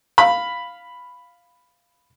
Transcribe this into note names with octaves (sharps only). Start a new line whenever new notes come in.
F5 B5